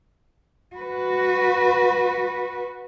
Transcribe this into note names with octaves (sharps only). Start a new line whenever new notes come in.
F#4 B4